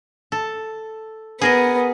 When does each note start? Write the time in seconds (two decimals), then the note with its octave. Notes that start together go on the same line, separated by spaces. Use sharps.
0.32 A4
1.41 B3 G#4 A#4 D#5